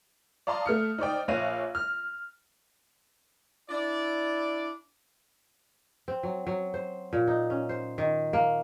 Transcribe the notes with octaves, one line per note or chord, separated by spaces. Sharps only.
D5 F5 A5 A#5 C6 D#6
A3 F6 C#7
D#4 C5 D5 G5
A#1 C#5 F5 F#6 A#6 D#7
F6
D4 E4 D5
C4
F#3
F#3
C5
A#2
D#4
C#4
C5
D#3
A#3